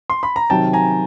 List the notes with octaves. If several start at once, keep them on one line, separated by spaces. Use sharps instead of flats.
C6
B5
A#5
C3 D#3 F#3 G5 A5
G#5 A#5